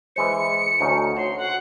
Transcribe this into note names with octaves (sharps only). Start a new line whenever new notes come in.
E3 G#3 C5 C#7
D2 C#4 D#4
F#4 C#5 C6
F#5